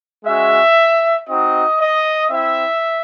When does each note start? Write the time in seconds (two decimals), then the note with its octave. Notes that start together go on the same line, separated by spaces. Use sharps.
0.24 G#3 C#4 F#4 E5
1.27 C4 D#4 F#4 D#5
1.79 D#5
2.30 C4 E4 E5